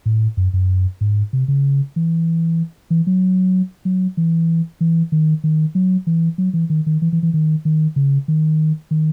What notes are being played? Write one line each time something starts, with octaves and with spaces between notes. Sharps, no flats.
A2
F#2
F#2
G#2
C3
C#3
E3
E3
F#3
F#3
E3
E3
D#3
D#3
F#3
E3
F#3
E3
D#3
D#3
E3
E3
E3
D#3
D#3
C#3
D#3
D#3